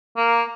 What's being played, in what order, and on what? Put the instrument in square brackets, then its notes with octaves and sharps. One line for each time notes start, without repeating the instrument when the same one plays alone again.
[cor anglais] A#3